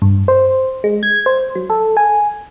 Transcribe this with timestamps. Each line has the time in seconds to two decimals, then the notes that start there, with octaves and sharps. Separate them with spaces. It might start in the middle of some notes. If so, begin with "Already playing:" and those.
0.02 G2
0.28 C5
0.84 G#3
1.03 G#6
1.26 C5
1.55 F#3
1.70 A4
1.97 G#5